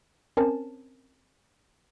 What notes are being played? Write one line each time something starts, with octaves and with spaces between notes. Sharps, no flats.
C4 C#4 A#4 G#5 A5